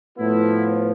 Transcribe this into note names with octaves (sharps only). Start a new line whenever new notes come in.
A2 F3 B3 E4